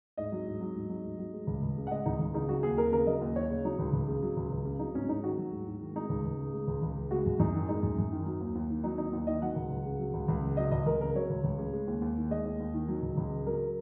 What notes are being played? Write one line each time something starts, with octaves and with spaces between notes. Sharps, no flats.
G#2 D#5
F#3
G#2
F#3
G#2
F#3
G#2
F#3
G#3
C#2
C#2
C#3
F#5
G#3 D#5
C#2 D#4
C#2
C#3 D#4
F#3 F#4
D#2 G#4
D#2 A#4
C#3 A#4
F#3 D#5
D#2
D#2 C#5
C#3
F#3 D#4
C#2
C#2
C#3
F#3
C#2
C#2
C#3
F#3 D#4
G#2 C#4
G#2 D#4
D#3 F#4
F#3
G#2
G#2
D#3
G#3 D#4
C#2
C#2
C#3
G#3
C#2
C#2
C#3
G#3 F#4
F#2
F#2 D#4
D#3
G#3 D#4
F#2
F#2
D#3
F#3
D#2
D#2
D#3
F#3 D#4
D#2 D#4
D#2
D#3 D#5
F#3 F#5
C#2
C#2
C#3
F#3
C#2
C#2
C#3
F#3 D#5
C#2 D#5
C#2 A#4
C#3 A#4
F#3 C#5
C#2
C#2
C#3
G#3
D#2
D#2
D#3
G#3 D#5
D#2
D#2
D#3
F#3
C#2
C#2
C#3
F#3 A#4